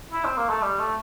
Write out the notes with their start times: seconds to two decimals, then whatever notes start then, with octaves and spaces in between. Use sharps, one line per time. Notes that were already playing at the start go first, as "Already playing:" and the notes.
0.13 E4
0.25 C4
0.37 A#3
0.49 A3
0.62 G3
0.79 A3